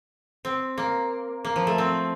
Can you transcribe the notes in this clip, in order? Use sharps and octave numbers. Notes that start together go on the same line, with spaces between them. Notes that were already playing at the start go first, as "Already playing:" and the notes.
C4
A#3
A#3
F3
A3
C4